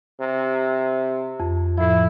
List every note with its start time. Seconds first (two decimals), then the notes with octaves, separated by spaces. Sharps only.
0.20 C3
1.40 F2
1.77 A2 F3 E4